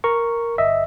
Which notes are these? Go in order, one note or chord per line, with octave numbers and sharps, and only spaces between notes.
A#4 A#5 C#6
G1 D#5 E5